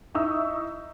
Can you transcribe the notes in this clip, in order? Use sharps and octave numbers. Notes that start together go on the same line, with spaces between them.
D#4 E4 E5 C#6 D#6 E6